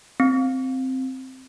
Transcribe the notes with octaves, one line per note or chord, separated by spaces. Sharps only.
C4